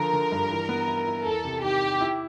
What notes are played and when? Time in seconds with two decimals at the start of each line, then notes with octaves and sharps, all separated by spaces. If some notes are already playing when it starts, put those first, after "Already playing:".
Already playing: D3 F3 A#4
0.13 D3
0.32 G2
0.51 E3
0.69 B3
0.88 E4
1.07 E4
1.25 E2 A4
1.45 C3
1.62 D#3 G4
1.82 D#3
2.01 E4